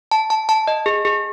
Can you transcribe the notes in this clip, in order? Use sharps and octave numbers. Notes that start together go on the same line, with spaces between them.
A5
A5
A5
D#5
G#4
G#4